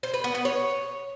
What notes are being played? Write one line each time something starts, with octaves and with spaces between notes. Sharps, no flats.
C5
B4
B3
B3
C#5